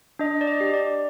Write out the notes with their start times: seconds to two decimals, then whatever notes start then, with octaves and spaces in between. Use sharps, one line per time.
0.19 D4 D#5
0.41 D5
0.47 D#5
0.60 G4
0.74 D5